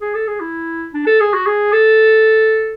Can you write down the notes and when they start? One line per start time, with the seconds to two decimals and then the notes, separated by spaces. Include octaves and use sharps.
0.01 G#4
0.15 A4
0.27 G#4
0.41 E4
0.94 D4
1.07 A4
1.20 G#4
1.34 F#4
1.47 G#4
1.72 A4